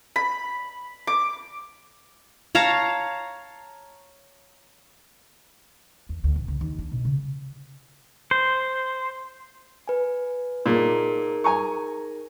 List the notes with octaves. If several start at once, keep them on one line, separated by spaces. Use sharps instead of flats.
B5
D6
C#5 F5 A5 A#5
E2
D2
A1
C#2
D#2
D4
B2
C#3
C5
B4 G#5
A#2 D#4 G#4 A#4
G#5 A#5 C#6